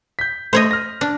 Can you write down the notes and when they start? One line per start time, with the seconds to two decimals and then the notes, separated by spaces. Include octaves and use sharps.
0.19 G6 B6
0.53 A3 C5 C#5 D#5
0.71 F6 A#6
1.01 D4